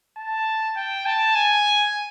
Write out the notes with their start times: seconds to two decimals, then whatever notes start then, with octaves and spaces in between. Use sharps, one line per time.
0.17 A5
0.76 G5
1.06 A5
1.35 G#5